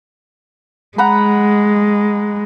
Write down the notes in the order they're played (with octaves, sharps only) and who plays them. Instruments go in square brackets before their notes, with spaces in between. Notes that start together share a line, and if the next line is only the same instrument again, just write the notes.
[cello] G#3 [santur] F#5 A#5 B5